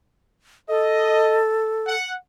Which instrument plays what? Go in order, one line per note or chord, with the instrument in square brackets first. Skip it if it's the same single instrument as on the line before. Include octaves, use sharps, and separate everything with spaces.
[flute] A4 [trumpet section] D#5
[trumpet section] F#5